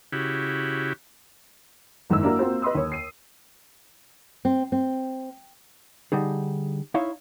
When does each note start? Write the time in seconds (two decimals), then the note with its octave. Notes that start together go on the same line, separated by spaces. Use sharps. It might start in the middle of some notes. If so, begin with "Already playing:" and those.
0.12 C#3 E4 F#4 G4
2.10 F#1 G#2 D#3 A#3 E4 E6
2.23 A#3 D4 E4 F#4 A#4
2.39 A#3 C4 F4 F#4 C5
2.62 B4 D#5 B5 C6 D#6 E6
2.75 D#2 C#5
2.92 C7 D#7
4.45 C4
4.72 C4
6.12 D3 G3 D#4 G#4
6.94 D#4 E4 C#5 E5 F5 C6